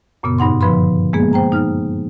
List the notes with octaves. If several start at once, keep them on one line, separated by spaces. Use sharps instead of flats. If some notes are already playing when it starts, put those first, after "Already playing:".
F#2 A#2 C#3 B3 D#6
G2 D#4 F#5 C6
D3 F3 B4 B5 C6
G#3 A#3 B3 G#4
C5 G5 A#5
D#4 F6